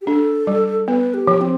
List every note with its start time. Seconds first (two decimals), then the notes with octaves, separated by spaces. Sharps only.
0.02 G4
0.07 D4 A4
0.47 G3
0.88 B3 B4
1.14 G4
1.27 F3
1.41 C4